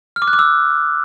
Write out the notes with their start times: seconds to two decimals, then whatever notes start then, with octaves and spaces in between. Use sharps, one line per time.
0.16 F6
0.22 D6
0.28 F#6
0.33 D6
0.39 E6